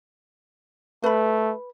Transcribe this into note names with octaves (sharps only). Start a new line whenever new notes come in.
A3 B4 B5